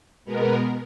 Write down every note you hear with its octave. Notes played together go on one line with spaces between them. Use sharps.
B2 G#3 B3 A#4